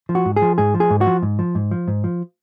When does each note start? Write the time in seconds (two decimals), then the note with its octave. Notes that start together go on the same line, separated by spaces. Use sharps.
0.09 F3
0.15 F#4
0.26 G#2
0.36 G#4
0.42 F3
0.58 G#2 G#4
0.74 F3
0.80 G#4
0.90 G#2
1.01 F#4
1.07 F3
1.22 G#2
1.39 F3
1.55 G#2
1.71 F3
1.88 G#2
2.04 F3